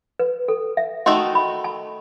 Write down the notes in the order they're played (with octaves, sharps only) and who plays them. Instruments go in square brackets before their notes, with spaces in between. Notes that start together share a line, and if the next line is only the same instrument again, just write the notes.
[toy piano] B4
A4
E5
[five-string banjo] D#3 A3 D#4 F#4 A4 [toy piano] C6
[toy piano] B5
A5